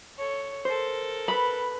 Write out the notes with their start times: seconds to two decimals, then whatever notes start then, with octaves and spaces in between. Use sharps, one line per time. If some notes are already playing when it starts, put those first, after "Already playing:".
0.17 A4 C#5
0.65 A4 A#4 C5
1.28 B4 B5